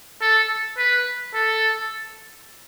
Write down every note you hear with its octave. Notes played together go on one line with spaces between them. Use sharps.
A4
B4
A4